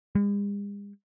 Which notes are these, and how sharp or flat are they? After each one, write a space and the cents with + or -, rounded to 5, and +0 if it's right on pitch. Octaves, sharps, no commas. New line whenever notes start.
G#3 -45